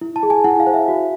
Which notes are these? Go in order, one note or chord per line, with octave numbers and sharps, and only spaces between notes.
E4
A5
G#4
G#5
E4 F#5
F5
C5
E5
F#4